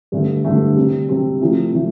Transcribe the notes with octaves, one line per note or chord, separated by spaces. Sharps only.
G2 D3 A3
G2 D3 A3
C3 G3 C4
C3 G3 C4
C3 F3 A3
C3 F3 A3